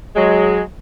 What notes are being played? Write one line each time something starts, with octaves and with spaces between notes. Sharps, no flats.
F#3 G#3